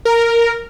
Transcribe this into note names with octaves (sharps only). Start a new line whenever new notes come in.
A#4